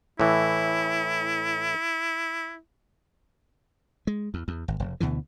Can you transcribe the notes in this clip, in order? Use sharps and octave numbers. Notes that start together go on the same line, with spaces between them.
A2 E3 E4
G#3
E2
E2
G#1
F1
D2 B2 D3 E3